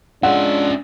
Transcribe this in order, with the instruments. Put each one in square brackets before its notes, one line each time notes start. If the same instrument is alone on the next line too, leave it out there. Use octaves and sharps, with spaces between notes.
[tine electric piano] G#3 F4 [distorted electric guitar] C#4 E5 [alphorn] D4 [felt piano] F#5